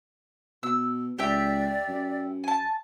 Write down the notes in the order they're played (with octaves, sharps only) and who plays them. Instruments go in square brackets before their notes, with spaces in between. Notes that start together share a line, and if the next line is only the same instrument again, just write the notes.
[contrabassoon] B2 [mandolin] E6
[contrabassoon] C#2 [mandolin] G4 E5 G5 [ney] D5
[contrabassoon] F#2
[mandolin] G#5 A5